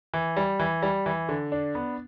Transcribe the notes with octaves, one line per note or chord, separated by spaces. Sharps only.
E3
G3
E3
G3
E3
D3
D4
B3